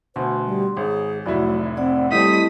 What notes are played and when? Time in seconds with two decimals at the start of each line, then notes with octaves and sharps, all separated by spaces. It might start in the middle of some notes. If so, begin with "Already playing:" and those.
0.16 D2 B2 C5 C6
0.45 G3
0.77 G#1 G#4 C#5
1.26 F1 A2 F#3 E4 D5
1.77 C4 D5 F#5
2.11 G3 A3 C4 E4 D#5 D#6 B6